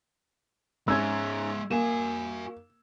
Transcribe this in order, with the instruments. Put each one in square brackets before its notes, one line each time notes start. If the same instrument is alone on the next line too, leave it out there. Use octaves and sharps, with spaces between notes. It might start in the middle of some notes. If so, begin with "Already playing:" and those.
[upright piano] G#2 C#4 [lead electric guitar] G#3 E5 [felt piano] E6 G#6
[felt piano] A#3 [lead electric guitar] F#4 G#5 [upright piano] E7